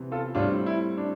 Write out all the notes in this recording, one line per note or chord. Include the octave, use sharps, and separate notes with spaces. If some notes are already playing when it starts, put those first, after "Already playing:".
Already playing: C3 E3 B3
F4 A4
A2 G3 C4 D4 F4
E4
D4